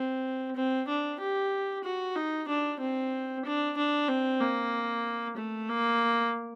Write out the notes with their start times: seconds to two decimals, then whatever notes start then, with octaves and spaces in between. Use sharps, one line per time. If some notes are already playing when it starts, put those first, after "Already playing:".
Already playing: C4
0.56 C4
0.88 D4
1.20 G4
1.84 F#4
2.15 D#4
2.48 D4
2.80 C4
3.45 D4
3.77 D4
4.08 C4
4.40 A#3
5.37 A3
5.69 A#3